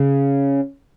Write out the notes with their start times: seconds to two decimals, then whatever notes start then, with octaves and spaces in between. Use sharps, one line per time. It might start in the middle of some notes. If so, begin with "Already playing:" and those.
Already playing: C#3